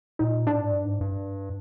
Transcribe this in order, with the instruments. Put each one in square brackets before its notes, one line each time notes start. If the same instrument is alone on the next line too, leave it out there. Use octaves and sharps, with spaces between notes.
[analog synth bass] A#2 [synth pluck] D#4
[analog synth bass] A2 [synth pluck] D4
[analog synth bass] G#2
G2
G#2
G2